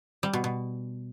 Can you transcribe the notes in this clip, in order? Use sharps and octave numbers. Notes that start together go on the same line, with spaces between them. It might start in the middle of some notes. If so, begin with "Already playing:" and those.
G3
B2
B2